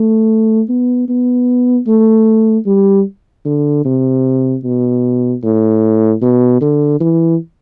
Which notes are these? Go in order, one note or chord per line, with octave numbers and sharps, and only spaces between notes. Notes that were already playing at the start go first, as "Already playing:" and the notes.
Already playing: A3
B3
B3
A3
G3
D3
C3
B2
A2
B2
D3
E3